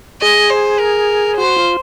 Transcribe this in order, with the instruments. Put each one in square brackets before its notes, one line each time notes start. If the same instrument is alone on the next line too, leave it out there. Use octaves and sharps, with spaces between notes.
[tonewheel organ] G#4 [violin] D#5
[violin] C5
A#4
[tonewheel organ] F#4 [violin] C5
[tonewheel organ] F4